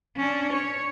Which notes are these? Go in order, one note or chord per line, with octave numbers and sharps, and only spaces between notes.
C#4 D4
C#5